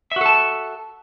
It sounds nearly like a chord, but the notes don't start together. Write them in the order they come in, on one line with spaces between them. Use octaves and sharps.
E5 F#4 A4 A5